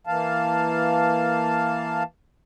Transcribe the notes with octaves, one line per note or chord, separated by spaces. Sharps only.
E3 A#3 F5 A5